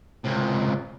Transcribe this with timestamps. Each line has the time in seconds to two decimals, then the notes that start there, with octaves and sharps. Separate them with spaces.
0.24 C#2 C3